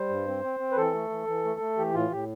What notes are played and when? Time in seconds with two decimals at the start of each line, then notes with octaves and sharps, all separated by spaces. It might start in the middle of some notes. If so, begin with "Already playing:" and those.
Already playing: G3 C5
0.09 G2
0.27 C4
0.44 C4
0.60 C4
0.72 B4
0.77 E3 A4
0.94 A3
1.10 E3
1.27 E3
1.45 A3
1.60 A3
1.78 E3 G4
1.94 A2 F4
2.12 A2 G4